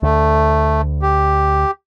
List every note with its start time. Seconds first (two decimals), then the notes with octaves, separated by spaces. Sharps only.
0.03 D2 A3
1.02 G4